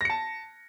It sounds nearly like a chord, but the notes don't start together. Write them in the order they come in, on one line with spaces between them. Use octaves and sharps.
A#6 C#7 A5